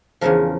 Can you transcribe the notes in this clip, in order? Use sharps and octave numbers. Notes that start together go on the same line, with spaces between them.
E2 C#3 F3 A#4